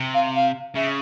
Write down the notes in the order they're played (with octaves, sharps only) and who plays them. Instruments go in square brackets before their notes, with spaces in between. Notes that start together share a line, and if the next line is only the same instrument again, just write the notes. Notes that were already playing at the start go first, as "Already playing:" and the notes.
Already playing: [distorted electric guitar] C3
[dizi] F5
F5
[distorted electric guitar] C#3 [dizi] E5